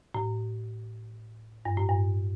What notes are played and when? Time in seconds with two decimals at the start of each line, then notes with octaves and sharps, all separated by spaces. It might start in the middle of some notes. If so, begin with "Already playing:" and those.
0.14 A2
1.65 G2
1.77 A2
1.89 G2